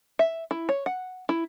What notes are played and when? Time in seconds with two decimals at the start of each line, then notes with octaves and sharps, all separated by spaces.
0.19 E5
0.51 E4
0.69 C#5
0.86 F#5
1.29 E4